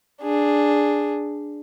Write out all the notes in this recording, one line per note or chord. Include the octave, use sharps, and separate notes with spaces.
D4 G#4